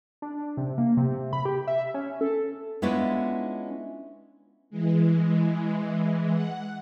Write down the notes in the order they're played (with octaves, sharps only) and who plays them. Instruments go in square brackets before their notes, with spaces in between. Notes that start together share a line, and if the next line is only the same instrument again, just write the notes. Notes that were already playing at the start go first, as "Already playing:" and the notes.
[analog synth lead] D4
C3
A#3
C3
B5
G4
E5
C#4
A4
[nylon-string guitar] G#3 B3 C#4 D4 E4 F4
[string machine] E3 G#3
F#5